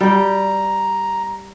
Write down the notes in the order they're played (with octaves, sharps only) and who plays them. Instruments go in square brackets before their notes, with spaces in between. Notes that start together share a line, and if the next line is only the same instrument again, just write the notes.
[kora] G3 G5 [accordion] A#5